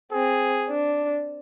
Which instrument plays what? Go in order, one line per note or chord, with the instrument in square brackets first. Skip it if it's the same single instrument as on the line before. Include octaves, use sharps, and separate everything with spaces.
[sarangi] C4 [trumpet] G#4
[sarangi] D4